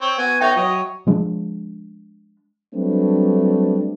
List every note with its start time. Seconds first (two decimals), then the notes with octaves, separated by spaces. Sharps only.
0.01 C4 C#5
0.18 B3 F#4 G#5
0.41 D#4 F#4 C#5 E5 G5
0.56 F#3 C#5 D#5
1.07 F3 G#3 D4
2.75 F#3 G3 A3 C4 D4 B4